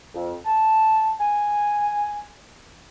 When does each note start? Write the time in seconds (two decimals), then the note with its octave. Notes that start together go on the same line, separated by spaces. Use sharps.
0.15 F2
0.45 A5
1.20 G#5